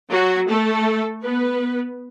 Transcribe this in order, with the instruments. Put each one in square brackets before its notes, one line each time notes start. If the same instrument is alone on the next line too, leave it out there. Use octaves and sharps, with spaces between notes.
[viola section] F#3 F#4
A3 A4
B3 B4